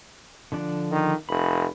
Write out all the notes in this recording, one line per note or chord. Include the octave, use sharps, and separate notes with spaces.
D3 F3 D4
D#3
F1 B5